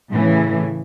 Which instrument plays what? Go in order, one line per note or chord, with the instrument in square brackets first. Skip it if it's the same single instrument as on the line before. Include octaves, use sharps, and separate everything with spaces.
[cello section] A2 C#3 E3